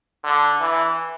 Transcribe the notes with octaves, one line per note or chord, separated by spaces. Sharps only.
D3
E3